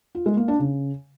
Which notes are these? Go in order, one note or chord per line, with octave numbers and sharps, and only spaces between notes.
F4
G#3
A#3
D4
C#3